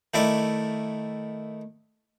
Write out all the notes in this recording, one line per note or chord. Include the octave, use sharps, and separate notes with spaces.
D#3 A3 E4 D5